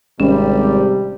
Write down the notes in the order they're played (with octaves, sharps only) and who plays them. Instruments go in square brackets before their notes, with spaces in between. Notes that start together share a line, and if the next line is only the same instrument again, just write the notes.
[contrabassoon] G#1 [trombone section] C3 G3 [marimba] C#4